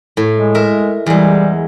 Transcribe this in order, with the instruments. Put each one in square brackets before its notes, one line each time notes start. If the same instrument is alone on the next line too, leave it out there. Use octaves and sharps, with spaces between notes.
[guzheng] A2
[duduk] G#3
[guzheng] A#4 E5
[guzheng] E2 G#3 [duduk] G3